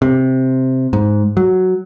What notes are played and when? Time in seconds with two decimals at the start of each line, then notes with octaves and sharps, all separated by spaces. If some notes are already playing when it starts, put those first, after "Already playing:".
0.02 C3
0.93 G#2
1.37 F#3